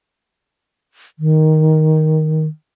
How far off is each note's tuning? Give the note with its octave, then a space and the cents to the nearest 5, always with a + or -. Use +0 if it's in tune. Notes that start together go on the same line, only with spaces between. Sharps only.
D#3 +5